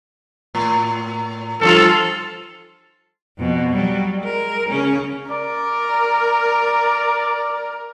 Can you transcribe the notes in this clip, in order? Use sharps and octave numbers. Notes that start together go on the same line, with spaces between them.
A2
G2 F3 F4 A4
F2 B2
F#3 G3
G#3 A#4
C#3 C#4
A#4 D5